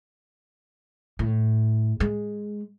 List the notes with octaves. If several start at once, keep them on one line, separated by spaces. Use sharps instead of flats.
A2
G#3